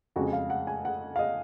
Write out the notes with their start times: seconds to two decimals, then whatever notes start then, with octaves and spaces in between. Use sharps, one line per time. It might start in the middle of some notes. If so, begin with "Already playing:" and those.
0.16 F2 C#3 G#3 F#4
0.33 F5
0.50 F#5
0.67 G#5
0.85 F#5
1.16 F5
1.19 D#5